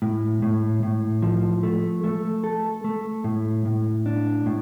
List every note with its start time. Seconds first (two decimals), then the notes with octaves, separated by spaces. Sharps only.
0.02 A2
0.42 A2
0.83 A2
1.22 F3
1.63 A3
2.04 A3
2.44 A4
2.84 A3
3.24 A2
3.65 A2
4.06 D4
4.46 A2